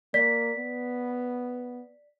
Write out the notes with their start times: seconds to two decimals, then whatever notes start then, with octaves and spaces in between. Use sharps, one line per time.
0.14 A#3 D5 B6
0.57 B3